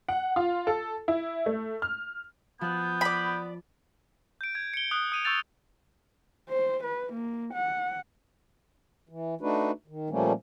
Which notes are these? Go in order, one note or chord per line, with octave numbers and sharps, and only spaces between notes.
F#5
F4
A4
E4
A3
F6
F3 B3 F#6 G6
D5 B5
G6 D7
G#6
C#7 G7
D#6 F#6
D#6 D#7 F7
C#6 E6 G6 A6 F7
C5
B4
A#3
F#5
E3
A3 D4 D#4 F#4 B4
D#3
A#2 F3 G3 A3 A#3 C#4